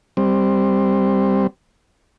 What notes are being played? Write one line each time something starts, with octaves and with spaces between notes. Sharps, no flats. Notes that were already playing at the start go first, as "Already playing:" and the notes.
G3 C4